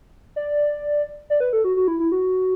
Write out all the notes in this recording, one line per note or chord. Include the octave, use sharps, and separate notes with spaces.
D5
D5
B4
A4
F#4
F#4
E4
E4
F#4